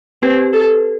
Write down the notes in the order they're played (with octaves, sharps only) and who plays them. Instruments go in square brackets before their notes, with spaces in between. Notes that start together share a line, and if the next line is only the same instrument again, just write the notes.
[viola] C4 [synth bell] G4 B4
[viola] A4